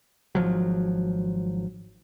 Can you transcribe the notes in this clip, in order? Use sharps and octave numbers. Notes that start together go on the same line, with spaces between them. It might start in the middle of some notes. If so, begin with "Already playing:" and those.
G#1 F3 F#3